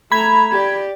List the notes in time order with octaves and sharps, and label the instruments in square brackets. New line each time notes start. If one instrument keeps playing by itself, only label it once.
[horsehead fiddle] A3 A#5 [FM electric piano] B5 G#6
[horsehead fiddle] G4 D5